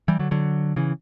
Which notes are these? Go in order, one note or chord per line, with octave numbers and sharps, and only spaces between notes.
E3 G3
D3 F#3
D3 F#3
C#3 E3